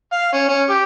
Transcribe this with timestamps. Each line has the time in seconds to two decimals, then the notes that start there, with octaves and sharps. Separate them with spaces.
0.13 F5
0.33 C#4
0.48 C#4
0.70 G4